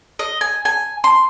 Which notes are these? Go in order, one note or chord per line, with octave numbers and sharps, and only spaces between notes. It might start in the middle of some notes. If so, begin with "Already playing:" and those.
D#5
G#5
G#5
C6